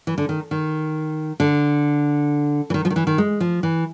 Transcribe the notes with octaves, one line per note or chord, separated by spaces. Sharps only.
E3
D3
D#3
D#3
D3
E3
D#3
F3
D#3
E3
D#3
G#3
F3
E3